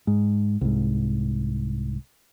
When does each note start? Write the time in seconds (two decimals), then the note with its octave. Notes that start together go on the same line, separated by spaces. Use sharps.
0.07 G#2
0.61 C2 G#2